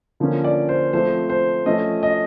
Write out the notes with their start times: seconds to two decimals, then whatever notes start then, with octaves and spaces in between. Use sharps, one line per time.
0.20 D3 F3 A#3 C#4
0.44 D5
0.69 C5
0.93 F3 A3 C4 C5
1.29 C5
1.66 F3 A3 C#4 D#5
2.03 D#5